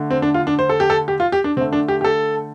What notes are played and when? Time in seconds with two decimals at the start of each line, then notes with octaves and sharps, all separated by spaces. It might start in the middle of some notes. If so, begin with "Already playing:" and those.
Already playing: D3 A3
0.11 C4
0.22 D4
0.34 F4
0.47 D4
0.59 C5
0.69 A4
0.80 G4
0.90 A4
1.08 G4
1.20 F4
1.32 G4
1.44 D4
1.57 D3 C4
1.61 A3
1.73 D4
1.88 G4
2.01 G4
2.04 A4